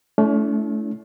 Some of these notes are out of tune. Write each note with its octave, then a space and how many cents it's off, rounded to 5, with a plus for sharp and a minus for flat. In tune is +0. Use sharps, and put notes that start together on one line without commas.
A3 -20 C#4 +40 E4 +0